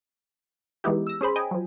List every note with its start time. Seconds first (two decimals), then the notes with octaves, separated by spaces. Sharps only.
0.84 E3 G#3 B3 D#4 E4 G4
1.07 E6 A#6
1.21 C#4 G#4 C5 B5
1.36 D#5 G5 G#5
1.51 F3 F#3